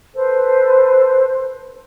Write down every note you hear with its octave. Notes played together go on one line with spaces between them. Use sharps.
A4 B4 C5